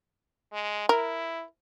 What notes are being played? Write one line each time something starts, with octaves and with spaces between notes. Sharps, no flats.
G#3
E4 A#4